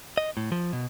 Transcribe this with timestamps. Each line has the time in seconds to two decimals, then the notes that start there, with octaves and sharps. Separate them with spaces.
0.18 D#5
0.37 A2
0.52 F3
0.73 B2